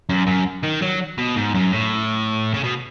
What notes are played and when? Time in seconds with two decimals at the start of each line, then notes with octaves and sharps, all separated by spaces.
0.09 F#2
0.27 F#2
0.63 D#3
0.82 F#3
1.18 B2
1.36 G#2
1.54 F#2
1.72 A2
2.54 C#3
2.64 B2